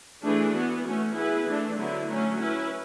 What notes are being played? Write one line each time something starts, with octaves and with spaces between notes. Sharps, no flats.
E3 A3 D4 G#4 B4
E3 B3 F#4
A3 C#4 F#4
B3 E4 G#4 B4
E3 A3 D4
D3 F#3 B3 E4
F#3 A3 C#4
C#4 E4 B4